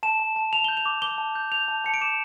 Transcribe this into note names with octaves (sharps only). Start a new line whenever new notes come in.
A5 E7
A5
A5
A5 F7
G6 G7
F7
D6
D6 G7
A5
G6
G6 F7
A5
A5 C#7
D7
D6 E7